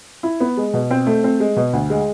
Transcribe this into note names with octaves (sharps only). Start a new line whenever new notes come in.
E4
B3
G#3
B2
C4
A3
C4
G#3
B2
D2
G#3